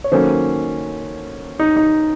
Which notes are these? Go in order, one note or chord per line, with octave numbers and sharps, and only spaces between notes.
C#5
D#3 F#3 A#3 C#4 A4 C5
D#4
D#4